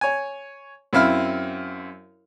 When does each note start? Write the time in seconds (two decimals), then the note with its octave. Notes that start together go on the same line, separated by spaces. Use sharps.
0.01 C#5 G#5
0.93 F#2 C4 E4 F5 F6